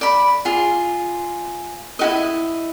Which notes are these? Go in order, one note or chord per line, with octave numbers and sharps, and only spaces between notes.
D5 B5
F4 G#4
E4 F#4 D#5